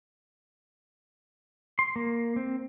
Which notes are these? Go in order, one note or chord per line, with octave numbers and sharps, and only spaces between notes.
C6
A#3
C4